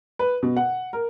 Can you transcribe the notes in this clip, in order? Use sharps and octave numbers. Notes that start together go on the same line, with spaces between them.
B4
B2
F#5
A#4